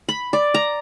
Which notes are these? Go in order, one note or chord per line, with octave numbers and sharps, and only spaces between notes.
B5
D5
A#5